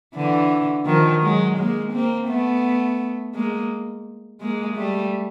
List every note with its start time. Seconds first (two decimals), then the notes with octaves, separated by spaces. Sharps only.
0.16 D3 E3
0.86 D#3 F3
1.22 F#3 G#3
1.58 G#3 A#3
1.93 A#3 C4
2.28 A3 B3
3.34 G#3 A#3
4.41 G#3 A#3
4.76 G3 A3